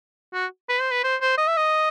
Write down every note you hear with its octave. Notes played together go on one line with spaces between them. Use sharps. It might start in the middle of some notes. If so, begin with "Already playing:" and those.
F#4
B4
C5
B4
C5
C5
D#5
E5
D#5